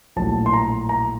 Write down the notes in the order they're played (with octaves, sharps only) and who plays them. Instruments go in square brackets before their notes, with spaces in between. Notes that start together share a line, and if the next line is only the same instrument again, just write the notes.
[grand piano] A#1 A2 F#3 A5
C6
A#5
A#5